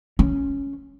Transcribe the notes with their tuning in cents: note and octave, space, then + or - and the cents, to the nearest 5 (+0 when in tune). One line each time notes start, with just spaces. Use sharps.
C#4 +5